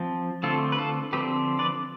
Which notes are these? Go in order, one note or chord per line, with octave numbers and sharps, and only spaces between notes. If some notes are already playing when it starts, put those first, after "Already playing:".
Already playing: F3 C4
D3 A3 C4 F4 A4
B4
F4 A4
D3 F3 C4 G4 B4
B4 D5